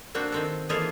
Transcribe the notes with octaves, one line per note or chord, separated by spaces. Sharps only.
A#3 C4 D4 F#4
D#3 C4 A4
E3 A#3 D#4 F4 G#4 A4